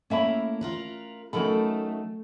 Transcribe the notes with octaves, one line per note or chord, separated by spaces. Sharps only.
A3 A#3 C#4 E4 E5 B5
F4 A#4 B4
F#3 A3 C#4 D#4 A4 A#4 B5